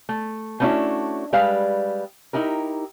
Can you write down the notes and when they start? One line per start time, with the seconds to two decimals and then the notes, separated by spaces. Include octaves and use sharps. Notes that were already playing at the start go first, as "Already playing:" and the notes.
0.09 A3
0.60 A3 B3 C#4 D4 E4 F#4
1.33 G3 G#3 B4 F5
2.33 D#4 E4 G4 A#4